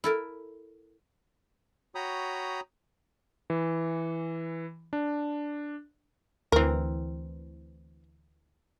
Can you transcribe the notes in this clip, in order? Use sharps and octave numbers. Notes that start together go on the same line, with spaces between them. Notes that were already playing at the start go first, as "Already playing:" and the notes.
E4 A4 A#4
F#4 C#5 G5 A#5 B5 D#6
E3
D4
D2 E3 C4 A#4